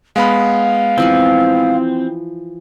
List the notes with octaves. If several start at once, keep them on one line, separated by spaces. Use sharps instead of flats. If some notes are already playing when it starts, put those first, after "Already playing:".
G#3 B3 F5 B5
E3 F3 C4 B4